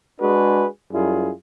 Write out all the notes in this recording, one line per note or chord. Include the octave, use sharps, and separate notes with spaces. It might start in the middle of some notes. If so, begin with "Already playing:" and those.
G#3 D4 F#4 G#4 B4
F#2 G3 E4 F4 G#4